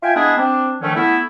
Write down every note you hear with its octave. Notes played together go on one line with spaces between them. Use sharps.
F4 E5 G5 G#5
G#3 B3 D4 E4 G#4
C4 D4
D3 D#3 F3 A3 C#4
A3 B3 E4